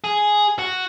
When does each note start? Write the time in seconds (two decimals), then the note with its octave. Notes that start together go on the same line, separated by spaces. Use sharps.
0.04 G#4
0.59 F#4